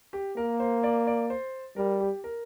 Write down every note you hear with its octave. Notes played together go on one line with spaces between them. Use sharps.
G4
A#3 A#4
C5
D5
D5
C5
G3 A#4
G4
A#4